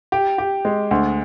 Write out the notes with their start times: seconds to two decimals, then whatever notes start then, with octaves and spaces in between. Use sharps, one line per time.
0.12 G4
0.38 G4
0.65 G#3
0.91 D2